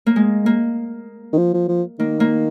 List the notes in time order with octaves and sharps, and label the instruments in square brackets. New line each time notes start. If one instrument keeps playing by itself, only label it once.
[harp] A#3
G#3
A#3
[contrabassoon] D#3
F3
F3
F3
[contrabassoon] D#3 [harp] A#3
[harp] A#3